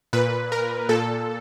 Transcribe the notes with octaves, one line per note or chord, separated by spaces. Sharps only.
A#2 B4
A#4
A#2 A4